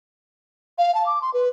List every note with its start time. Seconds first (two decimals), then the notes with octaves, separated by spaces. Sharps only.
0.78 F5
0.94 A5
1.06 D6
1.22 C6
1.34 B4